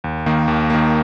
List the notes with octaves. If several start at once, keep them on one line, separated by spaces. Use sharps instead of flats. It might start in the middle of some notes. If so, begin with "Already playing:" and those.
D#2
D#3 A#3
D#2
D#3 A#3